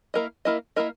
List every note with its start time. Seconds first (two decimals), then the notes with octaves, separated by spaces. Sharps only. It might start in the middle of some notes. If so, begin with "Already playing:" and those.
0.14 A#3 E4 A#4 D#5
0.45 A#3 E4 A#4 D#5
0.76 A#3 E4 A#4 D#5